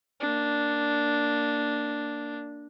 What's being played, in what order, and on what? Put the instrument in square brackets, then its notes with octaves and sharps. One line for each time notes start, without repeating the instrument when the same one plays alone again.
[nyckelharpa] A#3 D4